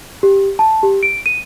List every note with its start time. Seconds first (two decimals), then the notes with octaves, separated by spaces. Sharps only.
0.23 G4
0.59 A5
0.83 G4
1.03 D7
1.26 D#7